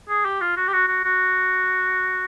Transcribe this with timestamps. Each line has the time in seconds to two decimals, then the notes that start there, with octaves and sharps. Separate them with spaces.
0.09 G#4
0.25 G4
0.41 F4
0.57 F#4
0.67 G4
0.73 F#4
0.88 F#4
1.04 F#4